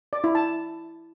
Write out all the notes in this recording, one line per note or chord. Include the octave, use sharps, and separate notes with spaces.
D5
E4
A5